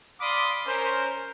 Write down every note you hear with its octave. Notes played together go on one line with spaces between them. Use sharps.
D5 F5 B5 C6 D6 D#6
C#4 A#4 C5